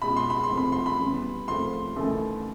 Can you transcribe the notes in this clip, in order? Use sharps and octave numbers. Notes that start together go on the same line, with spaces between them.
B2 G#3 C#4 F4 B5
C6
B5
C6
C2 C3 F3 A3 C4
B5
C6
B5
C#3 E3 G3 B3
A#2 F3 A3 C4 F4 C6
D#2 C#3 E3 A3